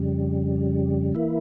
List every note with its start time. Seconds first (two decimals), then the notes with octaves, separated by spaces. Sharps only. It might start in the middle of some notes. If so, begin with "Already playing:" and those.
Already playing: F2 C#3 G3
1.15 E3 A#3 E4